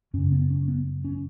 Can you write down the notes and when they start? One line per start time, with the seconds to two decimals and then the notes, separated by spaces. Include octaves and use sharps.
0.14 F#2 C#4
0.18 C#3
0.32 B3
0.50 C#4
0.68 B3
1.05 C#4